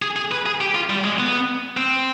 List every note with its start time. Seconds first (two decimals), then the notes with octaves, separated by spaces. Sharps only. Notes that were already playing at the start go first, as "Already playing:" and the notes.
0.02 G#4
0.16 G#4
0.32 B4
0.46 G#4
0.61 G4
0.75 F4
0.90 G3
1.04 G#3
1.19 B3
1.77 C4